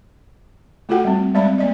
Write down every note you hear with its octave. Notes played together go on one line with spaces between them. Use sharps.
A3 F4 F#4 A4 F#5 G5
G3 C4
G3 G#3 C4 D5 E5 B5
A#3 D5 D#5